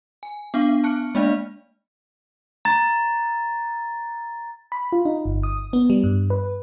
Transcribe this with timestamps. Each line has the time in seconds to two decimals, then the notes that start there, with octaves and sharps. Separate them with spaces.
0.23 G#5
0.54 B3 D4 F5 C#6
0.84 A5 C#6 F6 F#6 C#7
1.15 G#3 A#3 D4 D5 F5
2.65 A#5 A6
4.72 B5
4.92 F4
5.05 D#4
5.25 G1
5.43 D#6
5.73 B3
5.90 G3
6.04 G2
6.30 B4